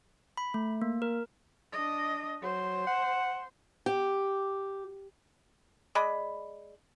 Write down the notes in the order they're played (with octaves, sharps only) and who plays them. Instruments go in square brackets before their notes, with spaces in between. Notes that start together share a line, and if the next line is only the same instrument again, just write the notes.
[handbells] B5
A3
A#3
A#4
[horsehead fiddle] D4 D#5
[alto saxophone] F#3 [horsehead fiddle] C5
[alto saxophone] F#5
[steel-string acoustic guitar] G4
[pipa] G#3 D5 D#5 B5